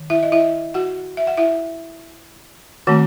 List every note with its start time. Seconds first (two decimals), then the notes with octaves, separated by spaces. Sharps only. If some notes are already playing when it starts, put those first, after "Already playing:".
Already playing: D#3
0.10 E4 E5
0.23 D#5
0.32 E4 E5
0.74 F#4 F#5
1.17 E5
1.27 F#5
1.37 E4 E5
2.87 D#3 A3 C4 F#4 F#5